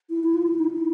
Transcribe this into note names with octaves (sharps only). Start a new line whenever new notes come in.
E4
E4
F4
E4
D#4
E4